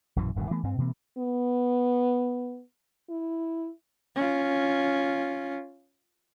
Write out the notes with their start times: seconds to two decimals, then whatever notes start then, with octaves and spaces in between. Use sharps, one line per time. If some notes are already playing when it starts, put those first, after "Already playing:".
0.16 A#1 F#2 B2 E3
0.36 D1 G2 B2 D#3
0.51 E3 A3 B3
0.63 G2 C4
0.78 B2 E3 A#3 C4
1.18 B3
3.10 E4
4.16 C#4 F4